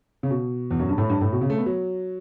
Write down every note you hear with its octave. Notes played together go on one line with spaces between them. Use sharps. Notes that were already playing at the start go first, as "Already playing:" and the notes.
C#3
B2
E2
F#2
G2
A2
G2
A2
B2
C#3
A3
B3
F#3